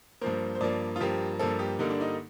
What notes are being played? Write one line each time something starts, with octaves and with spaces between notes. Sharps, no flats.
G2 F3 A#3 C5
C5
G2 F3 A#3 D5
F4
G2 F3 A#3 G4
G2 F3 A#3 A4
G4
G2 D3 G3 A#3 D#4
D4
D#4